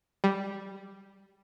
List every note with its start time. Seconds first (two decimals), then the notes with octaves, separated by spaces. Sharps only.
0.24 G3